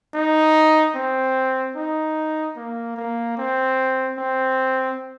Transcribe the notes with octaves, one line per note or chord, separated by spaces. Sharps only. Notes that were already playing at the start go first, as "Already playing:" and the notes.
D#4
C4
D#4
A#3
A#3
C4
C4